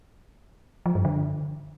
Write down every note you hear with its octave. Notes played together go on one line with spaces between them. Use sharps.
F3
G2
D3